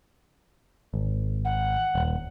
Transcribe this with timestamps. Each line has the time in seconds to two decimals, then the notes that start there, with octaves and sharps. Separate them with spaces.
0.94 G#1
1.45 F#5
1.95 D#1